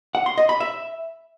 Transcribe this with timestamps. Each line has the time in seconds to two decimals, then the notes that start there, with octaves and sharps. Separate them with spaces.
0.15 F#5
0.26 C6
0.38 D#5
0.49 B5
0.60 E5